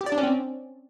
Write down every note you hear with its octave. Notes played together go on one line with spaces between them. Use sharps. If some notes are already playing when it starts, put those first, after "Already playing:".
G4
D5
D4
C#4
C4